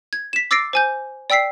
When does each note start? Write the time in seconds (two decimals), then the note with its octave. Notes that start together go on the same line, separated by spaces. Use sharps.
0.13 G#6
0.33 B6 E7
0.51 D6 E6 A6 A#6 C7 D7
0.73 C5 G#5 G6
1.30 D5 G5 E6 B6 C7